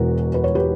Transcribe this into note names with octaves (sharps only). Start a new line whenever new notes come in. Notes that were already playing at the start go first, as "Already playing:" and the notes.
Already playing: E1 E2 B2 F#4 A#4
B4
C#5
G4 B4